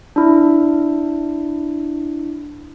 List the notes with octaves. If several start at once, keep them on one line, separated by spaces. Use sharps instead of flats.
D4 E4